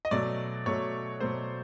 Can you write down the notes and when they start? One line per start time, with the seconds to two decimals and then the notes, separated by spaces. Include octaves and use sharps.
0.05 D#5
0.11 B2 F#3 A3 D5
0.66 B2 F#3 A3 C#5
1.20 B2 F#3 A3 C5